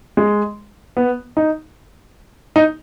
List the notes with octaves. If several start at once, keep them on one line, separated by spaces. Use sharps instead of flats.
G#3
B3
D#4
D#4